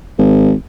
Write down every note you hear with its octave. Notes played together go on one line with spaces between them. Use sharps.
G#1